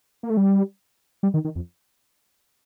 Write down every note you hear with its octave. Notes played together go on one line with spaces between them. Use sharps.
A#3
A3
G3
G3
D#3
D#3
F2